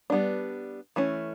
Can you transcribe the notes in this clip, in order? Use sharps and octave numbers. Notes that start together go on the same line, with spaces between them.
G3 B3 D4
E3 A3 C#4